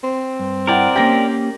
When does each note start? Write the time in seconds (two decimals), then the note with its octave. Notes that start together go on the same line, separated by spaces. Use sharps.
0.03 C4
0.40 G2
0.67 E4 A#4 D5 F#5 G5
0.96 A#3 C#4 G4 G5 A#6